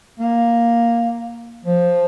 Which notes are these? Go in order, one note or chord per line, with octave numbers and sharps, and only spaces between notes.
A#3
F3